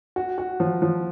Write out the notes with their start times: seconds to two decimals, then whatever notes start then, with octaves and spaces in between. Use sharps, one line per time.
0.16 F#4
0.38 F#4
0.60 F3
0.82 F3